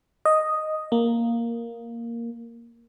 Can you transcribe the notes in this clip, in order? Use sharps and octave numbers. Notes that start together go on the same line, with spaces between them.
D#5
A#3